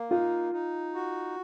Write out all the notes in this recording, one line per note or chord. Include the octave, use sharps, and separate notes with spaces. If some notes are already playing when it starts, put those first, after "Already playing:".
Already playing: A#3
D#4 F4
D#4
F#4